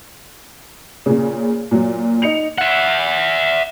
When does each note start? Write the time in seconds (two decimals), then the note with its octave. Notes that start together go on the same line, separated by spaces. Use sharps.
1.06 A#2 C#3
1.71 A#2 F#3
2.22 D#4 C#7 F7
2.58 E5 F#5